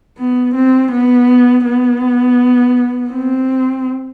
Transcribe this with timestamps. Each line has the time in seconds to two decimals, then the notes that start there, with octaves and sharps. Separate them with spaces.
0.18 B3
0.55 C4
0.92 B3
1.65 B3
3.11 C4